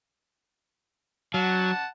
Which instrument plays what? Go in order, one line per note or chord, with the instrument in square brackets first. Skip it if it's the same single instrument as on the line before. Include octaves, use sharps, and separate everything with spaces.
[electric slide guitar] F#3 [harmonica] F#5 A5